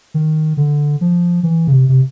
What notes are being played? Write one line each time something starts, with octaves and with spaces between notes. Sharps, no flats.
D#3
D3
F3
E3
C#3
C3
C3